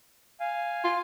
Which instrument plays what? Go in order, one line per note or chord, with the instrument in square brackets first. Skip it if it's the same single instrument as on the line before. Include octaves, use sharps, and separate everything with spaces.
[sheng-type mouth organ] F5 G#5
[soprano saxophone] F4